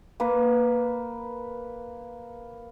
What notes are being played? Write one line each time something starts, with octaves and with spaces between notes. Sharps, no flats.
A#3 B4